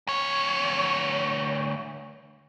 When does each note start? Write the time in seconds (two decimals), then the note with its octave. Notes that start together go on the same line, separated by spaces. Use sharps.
0.07 D2 C#5